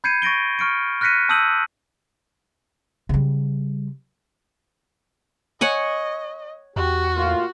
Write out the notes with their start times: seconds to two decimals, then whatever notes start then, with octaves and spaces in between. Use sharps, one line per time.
0.04 B5 G6 G#6 C7 C#7 D#7
0.22 C#6 A6 A#6 D7 G7
0.59 C#6 F6 C#7 D7
1.01 F6 F#6 A#6 B6 C#7 D#7
1.29 A5 D#6 E6 G6 D#7 F#7
3.09 C#3 G3
5.61 C#5 D#5 F#5 G#5
6.76 E2 F#4 G4
7.15 A2 A#3 F4